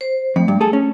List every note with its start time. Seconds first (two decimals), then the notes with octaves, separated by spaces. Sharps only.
0.01 C5
0.36 F2 A3
0.48 G2
0.61 G#4 A4
0.73 C#4